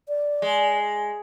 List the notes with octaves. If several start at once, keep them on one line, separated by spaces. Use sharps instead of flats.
D5
G#3